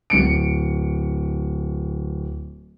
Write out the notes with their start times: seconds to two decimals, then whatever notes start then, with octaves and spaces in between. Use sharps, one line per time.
0.10 D1 C#7 D7